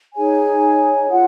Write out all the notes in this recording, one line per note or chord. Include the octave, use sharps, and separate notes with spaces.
D#4 G#4 C#5 G#5
F4 F#5